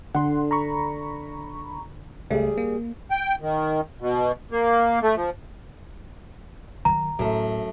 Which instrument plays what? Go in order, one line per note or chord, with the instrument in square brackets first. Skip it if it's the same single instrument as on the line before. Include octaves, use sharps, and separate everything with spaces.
[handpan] D3 [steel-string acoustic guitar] D4 [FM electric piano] F#5 C6
[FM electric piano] A#5 B5 C#6
[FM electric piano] C#2 A3 [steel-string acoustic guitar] G3 G#4
[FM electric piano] A#3
[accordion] G5
D#3
B2
A#3
A3
F3
[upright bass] D#3 F#3 [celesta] A#5
[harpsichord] F#2 A3 [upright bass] A2